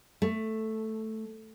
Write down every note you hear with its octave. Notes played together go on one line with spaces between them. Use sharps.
A3